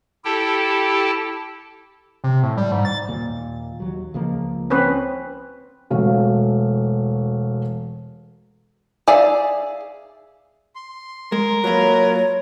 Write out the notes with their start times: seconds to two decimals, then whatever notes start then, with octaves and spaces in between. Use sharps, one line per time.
0.25 E4 G4 A4 G5 A5
2.24 C3
2.43 A2
2.57 G3
2.71 G#2
2.85 A6
3.08 D#2 A#2
3.80 D#2 F#3
4.14 C#2 F3 A#3
4.70 C4 C#4 B4
5.90 E1 A3 F#4 F5
9.08 G#4 D5 E5 F5
10.76 C6
11.32 G#3 A#4
11.64 F#3 A#3 F4 B4 C#5 A#5